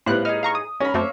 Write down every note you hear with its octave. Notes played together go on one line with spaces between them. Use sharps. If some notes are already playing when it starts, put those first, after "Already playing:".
A2 G3 B3 F4 C5 F#6
D#4 G#4 F6
F5 A#5 C#6
D#6
C#4 A#4 B5
F#2 A3 A#3 C4 C#5 E5